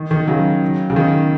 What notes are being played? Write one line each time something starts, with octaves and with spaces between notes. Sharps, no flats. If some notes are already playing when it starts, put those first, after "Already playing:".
Already playing: D#3
D#3
C#3 F#3
C#3
D#3